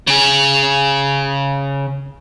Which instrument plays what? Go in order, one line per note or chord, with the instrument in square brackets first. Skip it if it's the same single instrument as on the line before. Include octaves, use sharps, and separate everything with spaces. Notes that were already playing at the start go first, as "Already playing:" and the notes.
[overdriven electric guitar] C#3 G#4